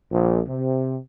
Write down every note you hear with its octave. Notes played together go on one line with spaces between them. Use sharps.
A#1
C3